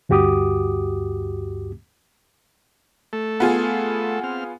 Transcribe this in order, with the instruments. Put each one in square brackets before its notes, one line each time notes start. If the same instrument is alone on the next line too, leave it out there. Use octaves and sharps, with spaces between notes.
[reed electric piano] D2 G2 F#4 G4 D6 D#6
[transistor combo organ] A3 A4
[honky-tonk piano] B3 F4 G#4
[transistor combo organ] C4 F6